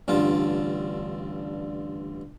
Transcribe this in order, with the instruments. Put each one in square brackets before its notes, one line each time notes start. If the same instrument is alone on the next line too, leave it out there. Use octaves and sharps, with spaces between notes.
[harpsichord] A1 G2 D3 F4